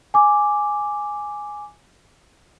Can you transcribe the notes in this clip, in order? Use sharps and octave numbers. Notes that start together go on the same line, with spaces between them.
G#5 D6